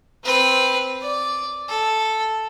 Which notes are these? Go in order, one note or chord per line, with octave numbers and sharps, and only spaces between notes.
C4 B4
D5
A4